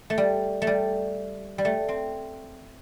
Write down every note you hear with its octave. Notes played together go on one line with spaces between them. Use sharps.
A3
G3
A3
G3
G3
A3
C4